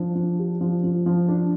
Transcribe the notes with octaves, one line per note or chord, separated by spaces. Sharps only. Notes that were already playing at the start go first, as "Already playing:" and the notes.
Already playing: F3 D4
F3
G4
F3
F3
F3
D4